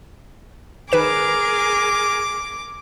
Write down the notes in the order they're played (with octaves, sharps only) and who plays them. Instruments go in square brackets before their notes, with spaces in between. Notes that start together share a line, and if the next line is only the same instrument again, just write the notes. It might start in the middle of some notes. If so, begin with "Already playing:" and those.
[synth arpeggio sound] D#3 B4 E7 [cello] G#4 A#4 [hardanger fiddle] D6